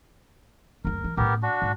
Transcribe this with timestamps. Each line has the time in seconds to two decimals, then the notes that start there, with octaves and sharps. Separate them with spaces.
0.85 F#1 D2 A#4
1.04 E3
1.17 A2 B3 C#4 G4 A#4
1.43 D4 F#4
1.62 G#2